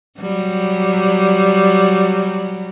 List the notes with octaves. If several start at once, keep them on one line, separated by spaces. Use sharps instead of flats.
F#3 G3